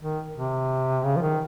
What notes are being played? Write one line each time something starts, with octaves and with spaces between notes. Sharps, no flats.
D#3
C3
C#3
F3
D#3